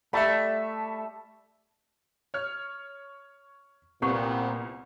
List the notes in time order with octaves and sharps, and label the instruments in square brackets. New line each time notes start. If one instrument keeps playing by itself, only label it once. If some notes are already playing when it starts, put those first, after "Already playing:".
[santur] G3 A4 [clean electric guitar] A3 [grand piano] E5 A5 B5
[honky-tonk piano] C#5 F6
[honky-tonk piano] C2 [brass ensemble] A#2 B3 C4 [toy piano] G4 F#5 C#6